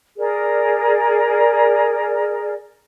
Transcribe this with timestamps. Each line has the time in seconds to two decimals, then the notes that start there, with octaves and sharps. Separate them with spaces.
0.17 G#4 A#4 D5